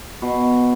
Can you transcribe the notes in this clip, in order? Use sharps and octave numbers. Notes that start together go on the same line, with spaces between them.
B2